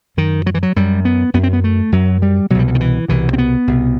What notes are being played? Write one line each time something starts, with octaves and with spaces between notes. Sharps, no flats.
F#2 D#3
F#3
E3
F#3
F#2 G3
B3
F#2 B3
C4
B3
A3
F#2 F#3
G3
C2 B2 F#3 G3
F#3
D#3
E3
C2 B2 E3
C4
B3
C2 B2